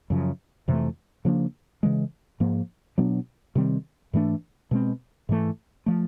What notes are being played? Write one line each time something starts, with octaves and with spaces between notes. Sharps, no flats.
F#2 C#3 F3
F2 C3 E3 A3
C#3 F3 A#3 D4
C#3 E3 G#3
G#2 F3 A#3
B2 F#3 B3 D4
C3 D#3 G3 C4
G#2 E3 A3 D4
B2 G#3 C4
G#2 E3 A3
F3 A3